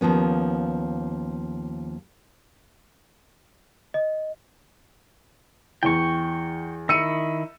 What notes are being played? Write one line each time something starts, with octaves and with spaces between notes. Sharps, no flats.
D#2 F3 B3 C#4
D#5
E2 E3 G5 C#6
D#3 E4 E6 C#7 D#7